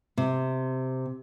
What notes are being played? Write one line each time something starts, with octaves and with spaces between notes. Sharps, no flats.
C3